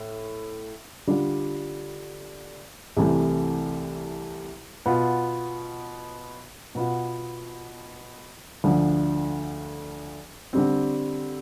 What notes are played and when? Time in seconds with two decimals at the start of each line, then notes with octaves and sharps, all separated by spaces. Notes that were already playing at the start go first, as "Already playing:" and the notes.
Already playing: A2
1.07 D3 G3 D4 F4
2.97 C2 C3 E3 A3
4.86 B2 B3 F4
6.75 B2 B3 F4
8.64 D2 D3 F3
10.53 D3 G3 C4